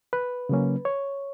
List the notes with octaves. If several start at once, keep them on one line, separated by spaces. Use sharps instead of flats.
B4
C#3 F#3 A#3 C#4
C#5